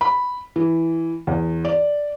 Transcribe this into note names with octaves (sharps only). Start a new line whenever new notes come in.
B5
E3
E2
D5